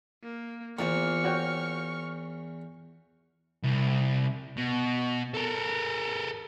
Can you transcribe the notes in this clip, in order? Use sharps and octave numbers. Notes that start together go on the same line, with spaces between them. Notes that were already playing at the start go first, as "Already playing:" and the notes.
A#3
E2 A#3 F4 C5 C#6 F6
F#4 C#5 G5
C2
B2
A4 A#4